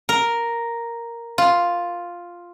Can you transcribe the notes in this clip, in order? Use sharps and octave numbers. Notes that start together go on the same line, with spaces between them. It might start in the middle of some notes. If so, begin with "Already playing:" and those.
A#4
F4